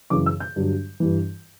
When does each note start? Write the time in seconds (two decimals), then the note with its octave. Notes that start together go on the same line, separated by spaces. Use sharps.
0.10 F#2 C#3 E3 D6
0.26 E6
0.40 G6
0.56 G2 D3 F#3
1.00 G2 E3